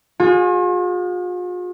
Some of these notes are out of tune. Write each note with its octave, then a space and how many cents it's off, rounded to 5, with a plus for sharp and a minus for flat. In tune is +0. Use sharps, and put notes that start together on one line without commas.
F4 +45 G#4 -30 G#5 +0